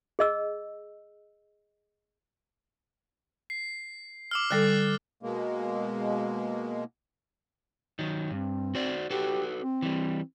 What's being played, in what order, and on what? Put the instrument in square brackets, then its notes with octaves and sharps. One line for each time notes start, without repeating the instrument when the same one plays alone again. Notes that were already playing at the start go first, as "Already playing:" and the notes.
[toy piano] G#4 D#5 E6
[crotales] C7
D6 E6 F6
[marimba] D3 G3 A4 [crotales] F#6 A6 C7
[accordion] B2 G#3 A#3
[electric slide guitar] D#3 F#3
[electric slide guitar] G2 [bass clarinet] C4
[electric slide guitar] F#4 C5 D5
[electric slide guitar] F#4 A4 B4 [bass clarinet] G4
[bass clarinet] C4
[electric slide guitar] E3 G3